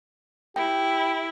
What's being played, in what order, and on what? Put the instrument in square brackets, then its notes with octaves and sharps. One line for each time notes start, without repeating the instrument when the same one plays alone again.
[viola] E4 [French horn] G4 [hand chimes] G5